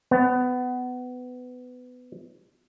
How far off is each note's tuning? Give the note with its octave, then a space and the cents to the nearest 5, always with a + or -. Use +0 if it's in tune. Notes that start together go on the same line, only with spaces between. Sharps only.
B3 +20